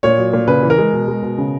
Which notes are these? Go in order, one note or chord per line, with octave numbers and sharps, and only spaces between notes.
A#2 C#5
F#3
A#2
C#3 B4
E3
A#4
G#3
B2
G#3
B2
C#3